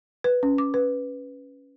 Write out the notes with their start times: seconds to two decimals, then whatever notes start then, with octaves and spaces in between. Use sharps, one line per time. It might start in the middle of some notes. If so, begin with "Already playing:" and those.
0.24 B4
0.43 C#4
0.58 D6
0.74 B4